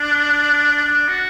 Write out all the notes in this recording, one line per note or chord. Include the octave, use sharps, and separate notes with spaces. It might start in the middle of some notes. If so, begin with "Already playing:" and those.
Already playing: D4
D4
F#4